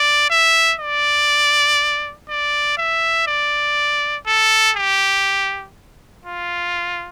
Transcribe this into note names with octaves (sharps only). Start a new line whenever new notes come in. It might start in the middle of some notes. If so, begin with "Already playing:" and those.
Already playing: D5
E5
D5
D5
E5
D5
A4
G4
F4